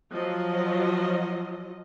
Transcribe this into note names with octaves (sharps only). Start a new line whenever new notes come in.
F3 F#3 F4 D#5